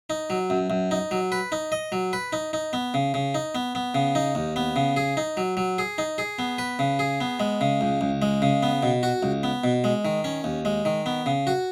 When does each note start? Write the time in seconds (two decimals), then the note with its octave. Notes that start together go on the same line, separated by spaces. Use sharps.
0.10 D#4
0.30 F#3
0.50 F#2
0.70 F#2
0.91 D#4
1.11 F#3
1.32 B4
1.52 D#4
1.72 D#5
1.92 F#3
2.13 B4
2.33 D#4
2.53 D#4
2.73 B3
2.94 C#3
3.14 C#3
3.35 D#4
3.55 B3
3.75 B3
3.95 C#3
4.15 D#4
4.35 D#2
4.56 B3
4.76 C#3
4.97 G#4
5.17 D#4
5.37 F#3
5.57 F#3
5.78 G#4
5.98 D#4
6.18 G#4
6.39 B3
6.58 B4
6.79 C#3
6.99 G#4
7.21 B3
7.40 G#3
7.61 C#3
7.81 C#2
8.01 C#2
8.22 G#3
8.42 C#3
8.63 B3
8.83 B2
9.03 F#4
9.23 C#2
9.43 B3
9.64 B2
9.84 G#3
10.05 D#3
10.24 C#4
10.44 D#2
10.65 G#3
10.85 D#3
11.06 B3
11.26 C#3
11.47 F#4